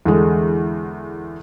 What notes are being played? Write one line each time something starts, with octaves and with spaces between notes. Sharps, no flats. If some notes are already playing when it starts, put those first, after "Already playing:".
E2 D3 G#3